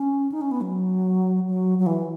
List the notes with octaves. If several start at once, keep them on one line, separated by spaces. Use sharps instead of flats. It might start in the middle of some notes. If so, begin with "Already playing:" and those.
Already playing: C#4
D#4
C#4
B3
F#3
F#3
F#3
E3